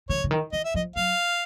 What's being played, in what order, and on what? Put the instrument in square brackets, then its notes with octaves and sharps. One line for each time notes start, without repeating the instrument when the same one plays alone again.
[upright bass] D#3 [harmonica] C#5
[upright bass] D3
D#3
[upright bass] E3 [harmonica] D#5
[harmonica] E5
[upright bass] F3 [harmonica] D#5
[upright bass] F#3 [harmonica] F5